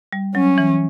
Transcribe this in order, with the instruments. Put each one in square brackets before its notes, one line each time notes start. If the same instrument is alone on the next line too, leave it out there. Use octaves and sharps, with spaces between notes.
[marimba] G3
[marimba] F#3 [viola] C#4
[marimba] E3